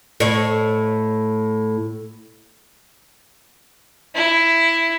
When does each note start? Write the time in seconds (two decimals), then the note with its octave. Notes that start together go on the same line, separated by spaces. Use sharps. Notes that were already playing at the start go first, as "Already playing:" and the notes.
0.20 A2 C#5
4.15 E4